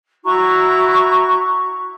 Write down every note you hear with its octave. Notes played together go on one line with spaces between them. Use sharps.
E4 F#4 A#5 C#6